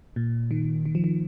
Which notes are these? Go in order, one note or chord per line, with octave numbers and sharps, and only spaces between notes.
A#2
D#3
D#3
F3
D#3